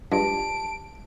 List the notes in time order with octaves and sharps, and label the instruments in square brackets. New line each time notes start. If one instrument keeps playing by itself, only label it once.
[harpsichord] G2 [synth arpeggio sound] G#3 D4 F4 [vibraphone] A5 [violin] D7